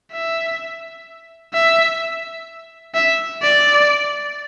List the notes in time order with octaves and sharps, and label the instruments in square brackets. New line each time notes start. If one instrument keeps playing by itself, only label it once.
[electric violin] E5
E5
E5
D5